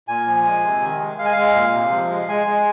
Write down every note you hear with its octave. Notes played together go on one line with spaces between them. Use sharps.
A#2 G#5
F3
G#3
C3
D#3
G#3
G#3 F5
G#5
G#3 F5
A#2
C3
F3
G#3
G#3 G#5
G#3